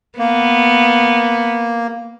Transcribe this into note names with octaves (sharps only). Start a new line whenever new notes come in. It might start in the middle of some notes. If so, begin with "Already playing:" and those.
A#3 B3